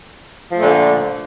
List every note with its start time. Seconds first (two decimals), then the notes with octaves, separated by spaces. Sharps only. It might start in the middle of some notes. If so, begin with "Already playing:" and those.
0.52 F3
0.55 A3
0.59 A#2
0.62 D3